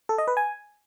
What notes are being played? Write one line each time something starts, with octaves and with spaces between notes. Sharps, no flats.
A4
D#5
B4
G#5